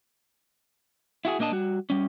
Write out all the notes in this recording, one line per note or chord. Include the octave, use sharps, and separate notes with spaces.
E4 F#4 G#4
A#2 A#3 D4 D#5 A5
G3 F#4
G3 C#4